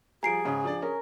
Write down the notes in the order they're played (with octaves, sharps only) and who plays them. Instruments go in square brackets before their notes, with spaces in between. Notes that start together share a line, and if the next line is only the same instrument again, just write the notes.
[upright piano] F3 G3 [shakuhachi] G#4 [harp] G#5 [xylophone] A#5 C7 D7
[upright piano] G#2 C#3 C#4
F3 D4 D5
[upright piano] C#4 [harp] A#4